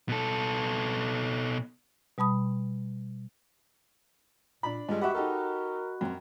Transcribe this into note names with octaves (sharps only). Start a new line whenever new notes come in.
B2 A4
B2 G3 A5 B5 D#6
A#2 D4 B5
G2 G3 G#3 F4 D#5
F#4 G4 B4 E5 F#5
D#4 G4 A4 A#4
F#2 C4 G5 G#5 A#5